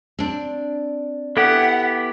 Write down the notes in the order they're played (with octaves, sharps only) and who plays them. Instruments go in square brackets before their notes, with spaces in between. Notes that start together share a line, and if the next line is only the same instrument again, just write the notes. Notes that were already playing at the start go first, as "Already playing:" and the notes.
[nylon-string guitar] C4 D4
[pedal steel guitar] B3 E4 G4 [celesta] A4 [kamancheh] F#5